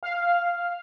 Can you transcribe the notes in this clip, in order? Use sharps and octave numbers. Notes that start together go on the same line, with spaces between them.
F5